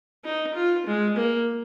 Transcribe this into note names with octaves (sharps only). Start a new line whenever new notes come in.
D#4
F4
G#3
A#3